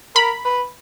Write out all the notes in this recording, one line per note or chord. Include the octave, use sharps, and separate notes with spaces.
A#4 B5
B4